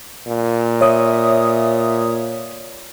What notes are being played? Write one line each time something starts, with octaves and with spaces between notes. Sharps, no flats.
A#2
C#5 E5 D#6